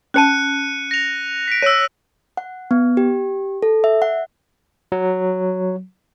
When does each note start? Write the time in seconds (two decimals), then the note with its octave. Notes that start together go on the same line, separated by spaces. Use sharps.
0.14 C#4 C5 A5 F#6 C#7 D#7
0.91 A#6 F7
1.48 B6 D7
1.62 C#5 E6 D#7
2.37 F#5
2.71 B3
2.97 G4
3.62 A4
3.84 E5
4.02 F#5
4.92 F#3